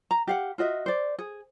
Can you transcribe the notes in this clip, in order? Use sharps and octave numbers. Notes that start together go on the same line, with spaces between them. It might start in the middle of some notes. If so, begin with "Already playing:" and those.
A#5
G4 F5 F#5
F4 F#4 D#5 E5
C5 D5
G#4